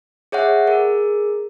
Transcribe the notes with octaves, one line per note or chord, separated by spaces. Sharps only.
G#4 C#5 E5 F#5
G#4 A#4